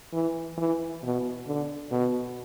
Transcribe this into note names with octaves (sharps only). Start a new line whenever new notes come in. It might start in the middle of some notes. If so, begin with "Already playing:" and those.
E3
E3
B2
D3
B2